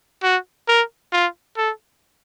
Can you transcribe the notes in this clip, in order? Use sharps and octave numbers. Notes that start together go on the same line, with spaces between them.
F#4
A#4
F4
A4